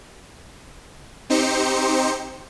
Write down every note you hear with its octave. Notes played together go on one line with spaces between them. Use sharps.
C4 D#4 G4 C5 C#7